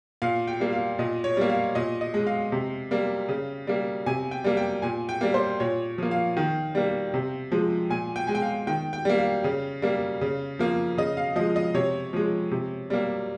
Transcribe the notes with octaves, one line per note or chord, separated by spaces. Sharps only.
A#2 F5
G5
G3 A#3
F5
A#2 D#5
C#5
G3 A#3
F5
A#2 D#5
D#5
G#3
F5
C3
G3 A#3
C#3
G3 A#3
C3 G#5
G5
G3 A#3
G5
A#2 G#5
G5
G3 A#3
C5
A#2 C#5
F3 A#3
F5
D#3
G3 A#3
C3
F3 G#3
A#2 G#5
G5
G#3 G#5
G5
F5
D#3 G5
G5
G3 A#3
F5
C#3
G3 A#3
C#3
F3 A#3
C#3 D#5
F5
F3 G#3 D#5
D#5
C3 C#5
F3 G#3
C3
G3 A#3